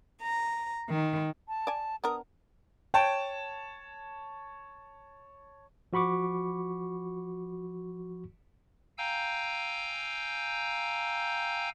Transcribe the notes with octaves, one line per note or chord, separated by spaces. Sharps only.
A#5
D#3
A5
D5 G#5
B3 D4 A#4 D#6
C#5 G5 A5
F3 F#4 B5 C#6 D6
F5 G5 G#5 A#5 E6 G6